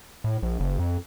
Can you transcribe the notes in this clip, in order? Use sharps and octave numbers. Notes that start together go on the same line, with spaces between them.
A2
A#1
F#1
F2